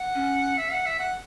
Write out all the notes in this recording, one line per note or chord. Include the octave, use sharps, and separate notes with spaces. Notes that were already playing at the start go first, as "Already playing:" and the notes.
Already playing: F#5
C#4
E5
F#5
E5
F#5